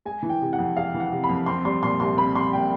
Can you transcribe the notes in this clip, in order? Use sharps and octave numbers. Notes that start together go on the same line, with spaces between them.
G#3 G#5
E3
G5
C3
F#5
F2
G#3 F5
E3
F#5
C3
B5
F2
C4 C6
G3 C6
A#2 C6
C2 C6
C4 B5
G3 C6
A#2 G5